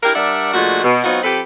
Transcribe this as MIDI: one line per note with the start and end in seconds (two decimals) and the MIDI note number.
0.03 0.12 62
0.03 0.12 64
0.03 0.12 67
0.03 0.12 70
0.15 0.50 55
0.15 0.50 62
0.15 0.50 70
0.15 0.50 74
0.15 0.50 76
0.15 0.50 78
0.54 0.80 46
0.54 0.80 53
0.54 0.80 56
0.54 0.80 57
0.54 0.80 62
0.54 0.80 66
0.84 0.99 47
1.04 1.20 54
1.04 1.20 59
1.04 1.20 60
1.04 1.20 63
1.04 1.20 65
1.04 1.20 66
1.23 1.40 53
1.23 1.40 60
1.23 1.40 67
1.23 1.40 69
1.23 1.40 71